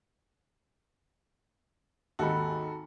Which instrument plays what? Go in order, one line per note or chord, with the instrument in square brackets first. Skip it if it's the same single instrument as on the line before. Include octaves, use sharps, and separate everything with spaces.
[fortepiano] G#1 D#2 [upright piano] F#4 A4 [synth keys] A5 B5